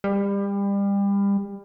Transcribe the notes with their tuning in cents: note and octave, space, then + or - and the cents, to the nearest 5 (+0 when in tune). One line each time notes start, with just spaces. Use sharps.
G3 +30